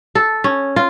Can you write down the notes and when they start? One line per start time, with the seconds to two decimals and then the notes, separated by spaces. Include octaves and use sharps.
0.15 A4
0.44 C#4
0.76 F4